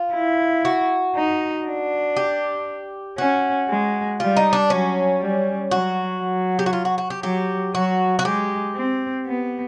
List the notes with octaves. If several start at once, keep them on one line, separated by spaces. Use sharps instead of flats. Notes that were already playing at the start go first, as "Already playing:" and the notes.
Already playing: F4
E4
F#4
D#4
D4
G4
C#4 F#4
G#3
G3 F4
D#4
D4
F#3 C#4
G3
F#3 F#4
F#3
G4
F#4
F4
F#4
F#4
G4
F#3 G4
F#3 F#4
F#4
G#3 G4
C4
B3